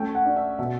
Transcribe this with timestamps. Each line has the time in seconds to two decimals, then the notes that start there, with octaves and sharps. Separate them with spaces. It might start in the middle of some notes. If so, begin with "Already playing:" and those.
Already playing: A3 C#4 G5
0.15 F#5
0.25 D4
0.36 E5
0.59 B2 E5